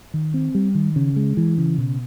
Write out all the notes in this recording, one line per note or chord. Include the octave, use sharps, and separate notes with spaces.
D#3
C4
G3
D#3
C#3
G#3
E3
C#3
B2